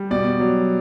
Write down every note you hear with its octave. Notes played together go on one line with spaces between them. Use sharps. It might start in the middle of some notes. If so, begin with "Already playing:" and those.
Already playing: G3
B2 D5
F#3